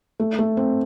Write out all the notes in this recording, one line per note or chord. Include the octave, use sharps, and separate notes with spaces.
A3
A3
C4